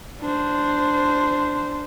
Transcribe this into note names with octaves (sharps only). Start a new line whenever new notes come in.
D4 C5